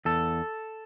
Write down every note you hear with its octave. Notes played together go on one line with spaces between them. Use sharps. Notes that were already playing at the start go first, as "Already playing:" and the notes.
E2 A4